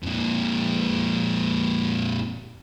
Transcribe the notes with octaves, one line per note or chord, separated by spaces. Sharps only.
F2 A#2